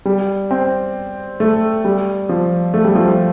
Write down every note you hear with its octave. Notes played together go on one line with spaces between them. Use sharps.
G3
C4
A3
G3
F3
A3
G3
F3
G3